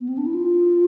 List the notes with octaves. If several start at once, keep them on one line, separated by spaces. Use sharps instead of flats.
B3
C4
D4
E4
F4